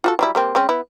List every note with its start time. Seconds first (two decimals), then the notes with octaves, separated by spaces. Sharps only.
0.04 F4 F#4 A4
0.19 F#3 G3 E4
0.35 G3 A#3 C4
0.55 G#3 C4 C#4
0.69 B3 E4